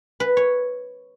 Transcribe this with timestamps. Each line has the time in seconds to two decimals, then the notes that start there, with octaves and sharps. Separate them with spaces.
0.20 B4
0.37 C#5